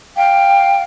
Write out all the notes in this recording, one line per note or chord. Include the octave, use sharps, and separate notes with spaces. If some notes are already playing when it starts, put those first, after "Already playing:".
F5 G5